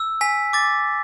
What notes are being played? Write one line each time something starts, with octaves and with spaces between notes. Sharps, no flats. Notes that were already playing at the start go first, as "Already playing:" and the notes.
Already playing: E6
G#5 B6
D6 A6